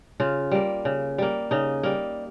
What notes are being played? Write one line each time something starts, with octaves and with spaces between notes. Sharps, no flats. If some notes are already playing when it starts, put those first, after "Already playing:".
C#3 F4
G3 A#3
C#3
G3 A#3
C#3 D#4
G3 A#3